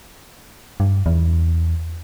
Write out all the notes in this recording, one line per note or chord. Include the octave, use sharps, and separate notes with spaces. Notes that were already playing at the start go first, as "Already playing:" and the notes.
G2
E2